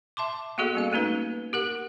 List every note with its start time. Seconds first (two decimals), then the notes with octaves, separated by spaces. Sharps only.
0.17 E5 A5 C6 D6
0.58 A#3 B3 F#4 G#4 A4 D#5
0.75 G3 C#4 F5
0.92 A3 A#3 C#4 D#4 B4
1.53 G4 A#4 F#5